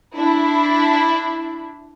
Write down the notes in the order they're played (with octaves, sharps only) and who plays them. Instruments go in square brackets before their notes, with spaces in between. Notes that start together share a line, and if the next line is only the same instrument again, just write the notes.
[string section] D4 E4